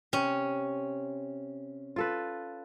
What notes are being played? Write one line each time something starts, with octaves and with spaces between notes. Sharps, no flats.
C3 C#4
F4 A4 B4